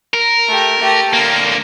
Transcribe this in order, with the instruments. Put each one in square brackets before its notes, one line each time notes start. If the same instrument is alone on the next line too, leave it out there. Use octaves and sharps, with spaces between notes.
[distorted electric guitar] A#4
[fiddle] A3 G4
A3 G4
[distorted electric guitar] D3 A#3 [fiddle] A#4